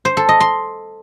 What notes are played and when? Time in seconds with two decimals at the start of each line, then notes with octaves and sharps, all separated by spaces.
0.05 C5
0.17 A4
0.29 D#5
0.40 C6